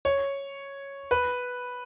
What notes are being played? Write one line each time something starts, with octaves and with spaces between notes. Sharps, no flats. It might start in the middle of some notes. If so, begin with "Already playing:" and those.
C#5
B4